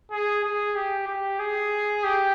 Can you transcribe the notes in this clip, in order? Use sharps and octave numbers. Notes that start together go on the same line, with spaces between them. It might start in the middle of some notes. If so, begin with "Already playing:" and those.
G#4
G#4
G4
G4
G#4
G4